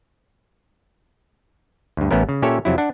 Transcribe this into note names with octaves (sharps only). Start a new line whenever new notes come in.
D2 G2
A1 A3 B3 C#4 A#4
C#3
A#2 C#4 G4 A4 C#5 E5
F2 C3 F#3 E4
D4 F#5